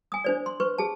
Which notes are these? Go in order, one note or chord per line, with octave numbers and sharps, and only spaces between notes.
G#5 D#6
D4 C5 D5
C6
B4 C5 C#6
G#4 A5